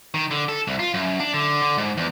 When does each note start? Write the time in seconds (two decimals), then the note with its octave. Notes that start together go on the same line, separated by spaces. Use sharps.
0.14 D#3
0.31 D3
0.49 A4
0.67 C2
0.79 F4
0.94 F#2
1.20 D4
1.34 D3
1.62 D3
1.78 G#2
1.98 E2